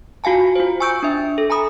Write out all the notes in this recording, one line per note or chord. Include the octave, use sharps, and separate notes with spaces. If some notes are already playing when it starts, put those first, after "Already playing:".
F4 F#4 F5 G#5 A5
F4 C5
G#5 C#6 E6 G6 D7
D4 E5
A4
G#5 A#5 B5 D#6